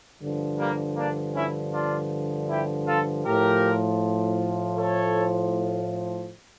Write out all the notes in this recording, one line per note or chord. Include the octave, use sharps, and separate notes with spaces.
G2 D3 F3
G3 A#3
A#3 D4
C#4 E4
D4 F4
E4 G4
F4 A4
A2 F3 G4 A#4
A4 C#5